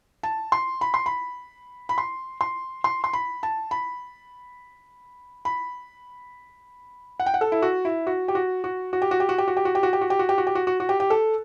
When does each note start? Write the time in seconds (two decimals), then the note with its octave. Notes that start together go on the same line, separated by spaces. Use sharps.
0.23 A5
0.52 C6
0.81 B5
0.94 C6
1.06 B5
1.89 B5
1.98 C6
2.41 C6
2.84 C6
3.04 C6
3.13 B5
3.43 A5
3.71 B5
5.45 B5
7.20 F#5
7.26 G5
7.34 F#5
7.41 A4
7.52 E4
7.62 F#4
7.85 E4
8.07 F#4
8.28 G4
8.35 F#4
8.64 F#4
8.93 F#4
9.02 G4
9.11 F#4
9.20 G4
9.29 F#4
9.38 G4
9.48 F#4
9.57 G4
9.65 F#4
9.75 G4
9.83 F#4
9.93 G4
10.01 F#4
10.10 G4
10.19 F#4
10.29 G4
10.38 F#4
10.47 G4
10.55 F#4
10.67 F#4
10.80 F#4
10.89 G4
11.00 G4
11.10 A4